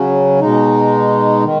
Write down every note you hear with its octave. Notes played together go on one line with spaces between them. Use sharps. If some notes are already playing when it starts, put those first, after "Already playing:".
Already playing: C#3 F#3 C#4
B2 G#3 D#4
D#3